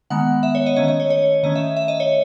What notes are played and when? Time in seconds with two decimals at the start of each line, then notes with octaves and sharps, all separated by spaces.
0.10 D#3 G#3 B3 F#5
0.43 E5
0.55 C#5
0.66 D#5
0.76 D#3 A3 C#4 D#5
0.88 D#5
1.00 C#5
1.10 C#5
1.43 D#3 A3 C#4 D#5
1.55 E5
1.77 E5
1.88 D#5
2.00 C#5